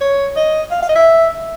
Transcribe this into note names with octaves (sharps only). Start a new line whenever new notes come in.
C#5
D#5
F5
F5
D#5
E5